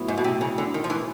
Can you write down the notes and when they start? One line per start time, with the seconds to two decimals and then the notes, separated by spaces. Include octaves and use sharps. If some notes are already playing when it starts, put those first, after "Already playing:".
Already playing: A2 F#3 B3 E4
0.08 G#2
0.18 B2
0.24 C3
0.41 C#3
0.58 D3
0.74 D#3
0.84 F3
0.90 E3